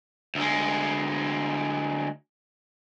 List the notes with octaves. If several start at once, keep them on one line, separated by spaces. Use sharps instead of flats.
D2 G#3